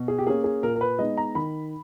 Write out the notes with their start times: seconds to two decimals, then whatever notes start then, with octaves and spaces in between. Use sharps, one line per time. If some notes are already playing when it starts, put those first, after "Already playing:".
Already playing: B2
0.08 G#4
0.18 G4
0.27 A#3 C#4 G#4
0.44 G#4
0.62 A#2 A#4
0.76 A#4
0.81 B4
0.99 G#3 B3 D#4 D#5
1.17 A#5
1.35 D#3 B5